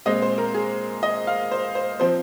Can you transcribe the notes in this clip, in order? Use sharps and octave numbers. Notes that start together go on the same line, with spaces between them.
A#2 G#3 C4 D#5
C5
A#4
G#4
D#5
F5
C5
C5
F3 C4 C5